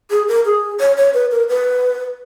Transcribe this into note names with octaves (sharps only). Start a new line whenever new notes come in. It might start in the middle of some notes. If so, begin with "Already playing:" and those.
G#4
A#4
G#4
C#5
C#5
B4
A#4
B4